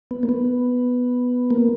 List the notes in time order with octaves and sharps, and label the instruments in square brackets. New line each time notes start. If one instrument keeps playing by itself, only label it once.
[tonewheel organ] B3
A#3
B3
A#3